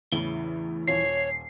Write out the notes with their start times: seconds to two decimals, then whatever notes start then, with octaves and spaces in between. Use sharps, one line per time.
0.13 E2 A2 C#3 E3
0.88 D#1 F4 C#5 C7